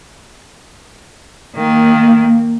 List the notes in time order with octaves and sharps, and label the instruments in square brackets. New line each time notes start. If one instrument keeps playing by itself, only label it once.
[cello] D#3 [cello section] A#3